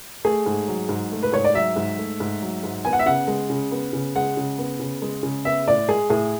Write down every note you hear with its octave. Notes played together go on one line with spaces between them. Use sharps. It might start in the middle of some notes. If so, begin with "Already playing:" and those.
A3 G#4
G#2
F#3
G#2
A3
B4
G#2 C#5
D5
F#3 E5
G#2
A3
G#2
F#3
G#2
B3 G#5
F#5
E5
C#3 F#5
G#3
C#3
B3
C#3
G#3 F#5
C#3
B3
C#3
G#3
C#3
B3 E5
A2 D5
G#3 G#4
A2 G#4